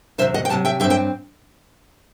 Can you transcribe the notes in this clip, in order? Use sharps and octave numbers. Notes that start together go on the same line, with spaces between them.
E2 C3 F#3 C5 E5
D#5 F#5
G5
E2 C3 F#3 F#5 A5
E5 G5
G2 F#3 C4 E5 G5
E5 G5